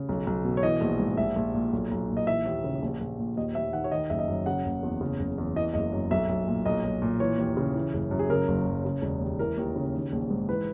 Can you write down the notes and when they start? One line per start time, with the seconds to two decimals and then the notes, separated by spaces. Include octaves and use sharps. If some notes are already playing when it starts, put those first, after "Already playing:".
Already playing: C#3
0.09 B1
0.27 B1
0.44 B2
0.57 C#5
0.63 E3 D#5
0.81 A#1
1.00 G#2
1.17 A#1 E5
1.36 A#1
1.54 A#2
1.73 B1
1.91 B1
2.09 A#2
2.17 D#5
2.27 E3 E5
2.45 D#2
2.64 C#3
2.82 A#1
3.01 A#1
3.19 A#2
3.37 D#2 D#5
3.55 D#2 E5
3.73 D#3 F#5
3.84 C#5
3.92 D#3 D#5
4.10 F#1 E5
4.19 D#5
4.28 F#2
4.46 C#3 F#5
4.65 F#1
4.83 E2
5.01 C#3
5.19 F#1
5.38 E2
5.56 E3 D#5
5.74 F#1 D#5
5.92 F#2
6.11 B1 E5
6.29 B1
6.48 A#2
6.66 B1 D#5
6.84 B1
7.02 A#2
7.20 E3 C#5
7.38 D#2
7.57 C#3
7.74 E3
7.93 F#1
8.11 F#2
8.19 G#4
8.30 C#3 A#4
8.48 F#1
8.66 F#2
8.85 C#3
9.02 E1
9.21 D#2
9.39 E3 A#4
9.57 D#2
9.76 C#3
9.94 D#3
10.12 A#1
10.30 G#2
10.48 E3 B4